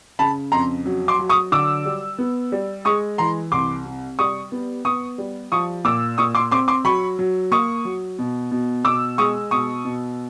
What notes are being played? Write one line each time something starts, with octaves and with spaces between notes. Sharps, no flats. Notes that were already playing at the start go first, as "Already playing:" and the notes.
C#3 A5 B5
F2 A#5 C6
F#3
C6 D6
F#3
C#6 D#6
D3 D6 E6
G3
B3
G3
G#3 C#6 D#6
E3 A#5 C6
C2 C6 D6
C3
G3 C#6 D#6
B3
B3 C#6 D#6
G3
F3 C#6 D#6
A#2 D6 E6
A#2 C#6 D#6
C6 D6
C4 C6 D6
C6 D6
F#3 B5 C#6
F#3
A#3 C#6 D#6
F#3
B2
B2
B2 D6 E6
G#3 C#6 D#6
B2 C#6 D#6
B2